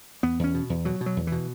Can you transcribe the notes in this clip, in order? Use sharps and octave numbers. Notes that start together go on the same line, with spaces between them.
E2 B3
E2 C#4
B2
E2
B2 F#3
B2
F#3
E2
B2 E3